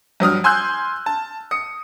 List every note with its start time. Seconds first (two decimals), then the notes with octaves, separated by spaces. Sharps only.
0.20 G2 F#3 D#6 F6
0.44 G#5 C6 E6 F#6 G6
1.06 A5
1.51 D#6 C#7